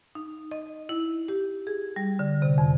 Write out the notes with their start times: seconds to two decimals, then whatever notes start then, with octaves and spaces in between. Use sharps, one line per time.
0.15 D#4
0.51 D#5
0.89 E4
1.28 G4
1.67 G#4
1.96 G3
2.19 D3
2.42 C3
2.58 F2